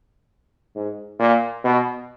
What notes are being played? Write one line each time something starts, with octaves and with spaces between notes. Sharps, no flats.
G#2
A#2
B2